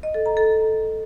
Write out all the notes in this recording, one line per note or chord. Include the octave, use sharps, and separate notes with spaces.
D#5
A4
A#5
A4